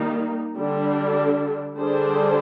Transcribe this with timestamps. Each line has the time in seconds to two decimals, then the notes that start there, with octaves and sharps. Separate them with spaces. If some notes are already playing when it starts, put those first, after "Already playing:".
Already playing: D#3 G3 A#3 D#4
0.58 D3 G3 D4
1.78 D3 G3 D4 G#4 C5